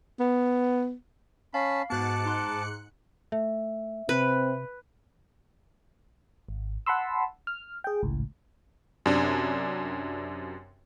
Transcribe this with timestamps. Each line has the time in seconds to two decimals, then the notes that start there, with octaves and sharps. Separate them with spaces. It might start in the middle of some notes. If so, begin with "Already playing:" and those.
0.20 B3
1.54 C#4 F5 A5 B5
1.90 G#2 B3 F#4 A5 D6 F#6 A6 C#7
2.26 D#4 C6
3.32 A3 E5
4.09 C3 C4 B4
6.48 G#1
6.86 F#5 A5 B5 C6 E6
7.47 F6
7.84 G#4 G5
8.03 G#1 C#2 A2
9.06 F#2 C3 D4